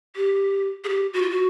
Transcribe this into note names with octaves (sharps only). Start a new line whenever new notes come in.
G4
G#4
G4
F#4
F4
F#4